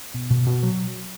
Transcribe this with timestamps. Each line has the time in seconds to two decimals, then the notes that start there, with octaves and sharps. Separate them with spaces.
0.14 B2
0.30 B2
0.46 B2
0.63 F#3